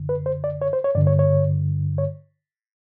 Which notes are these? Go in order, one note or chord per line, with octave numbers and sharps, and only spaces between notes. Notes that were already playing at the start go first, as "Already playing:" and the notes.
Already playing: F#2 D3
B4
C5
D5
C#5
C5
C#5
G2 D3 D5
C#5
C#5
C#5